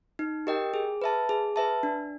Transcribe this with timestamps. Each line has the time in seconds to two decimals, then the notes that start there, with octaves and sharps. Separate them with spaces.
0.19 D#4
0.47 G4 A#4 D#5 G5
0.74 G#4
1.02 B4 E5 A5
1.29 G#4
1.56 B4 E5 A5
1.83 D4